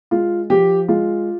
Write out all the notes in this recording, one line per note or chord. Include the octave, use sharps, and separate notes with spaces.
G#3 F4
F3 G4
G#3 F4